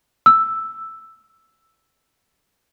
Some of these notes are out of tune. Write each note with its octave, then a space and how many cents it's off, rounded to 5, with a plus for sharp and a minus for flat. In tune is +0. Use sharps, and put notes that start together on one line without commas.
E6 +0